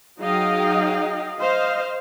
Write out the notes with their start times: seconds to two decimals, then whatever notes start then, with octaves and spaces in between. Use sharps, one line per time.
0.20 F#3 D#4 G#4 D#5 F5 G5
1.39 C5 D#5 F5